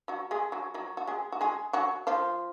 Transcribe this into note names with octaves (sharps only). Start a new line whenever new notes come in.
F#3 F#4
G#3 G#4
F#3 F#4
F#3 F#4
F#4
G#3 G#4
F#4
G#3 G#4
F#3 F#4
F3 F4